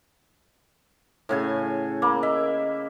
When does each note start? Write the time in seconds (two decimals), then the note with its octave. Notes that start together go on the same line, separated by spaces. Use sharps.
1.29 A2 C#3 G#5
2.02 A#3 B5 D6
2.23 D#5 E5